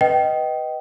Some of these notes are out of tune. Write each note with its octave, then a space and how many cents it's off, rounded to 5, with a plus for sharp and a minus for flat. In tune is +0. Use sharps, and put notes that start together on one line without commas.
B4 +0 D#5 +0 G5 -25